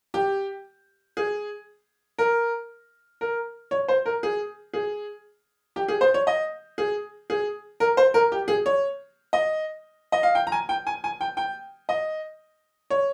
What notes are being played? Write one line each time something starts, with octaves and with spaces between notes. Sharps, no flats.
G4
G#4
A#4
A#4
C#5
C5
A#4
G#4
G#4
G4
G#4
C5
C#5
D#5
G#4
G#4
A#4
C5
A#4
G4
G#4
C#5
D#5
D#5
F5
G5
A#5
G#5
G5
G#5
G#5
G5
G5
D#5
C#5